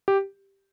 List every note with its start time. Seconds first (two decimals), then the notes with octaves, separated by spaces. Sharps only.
0.08 G4